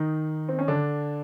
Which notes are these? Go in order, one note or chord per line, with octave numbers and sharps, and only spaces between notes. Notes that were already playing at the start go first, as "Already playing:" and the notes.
Already playing: D#3 D#4
C4
C#4
D3 D4